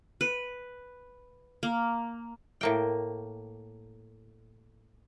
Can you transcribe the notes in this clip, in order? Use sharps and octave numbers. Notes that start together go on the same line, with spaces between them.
B4
A#3
A2 A#3 G5